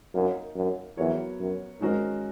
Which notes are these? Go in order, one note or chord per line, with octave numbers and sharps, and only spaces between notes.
F#2 A#3 D#4 A#4
F#2
E2 F#3 B3 F#4 A#4 C#5
F#2
G#2 D#3 G#3 C#4 F#4 A#4